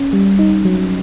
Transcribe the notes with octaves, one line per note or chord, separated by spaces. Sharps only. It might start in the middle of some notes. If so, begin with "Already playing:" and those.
Already playing: C#4
G3
D#4
F#3